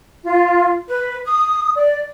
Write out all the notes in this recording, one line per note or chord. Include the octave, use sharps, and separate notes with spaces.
F4
B4
D#6
D5